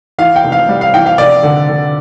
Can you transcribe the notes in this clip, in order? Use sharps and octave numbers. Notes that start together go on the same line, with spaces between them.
E3 F5
G5
F1
F5
G3
F5
E3 G5
F5
F1 D5
D3
D3